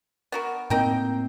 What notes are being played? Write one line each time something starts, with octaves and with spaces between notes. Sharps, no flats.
B3 F#4 A#4
A2 A#3 C4 D#4 A#4 G5